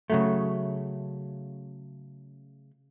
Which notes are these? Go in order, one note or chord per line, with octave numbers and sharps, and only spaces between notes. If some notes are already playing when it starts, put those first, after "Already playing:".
C#3 F#3 A3